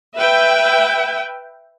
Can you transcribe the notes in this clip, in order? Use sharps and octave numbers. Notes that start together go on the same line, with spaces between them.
B4 E5 G5